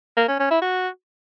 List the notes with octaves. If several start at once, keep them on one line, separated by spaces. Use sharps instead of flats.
A#3
C#4
C#4
E4
F#4